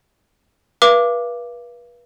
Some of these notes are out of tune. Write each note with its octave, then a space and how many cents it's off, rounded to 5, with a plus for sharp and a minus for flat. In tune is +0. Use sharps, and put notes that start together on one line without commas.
B4 -35 F5 -40 D6 +0